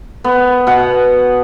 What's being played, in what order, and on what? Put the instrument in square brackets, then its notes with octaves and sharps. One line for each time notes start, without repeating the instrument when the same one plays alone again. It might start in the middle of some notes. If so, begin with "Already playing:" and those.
[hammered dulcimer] B3
B2 F#5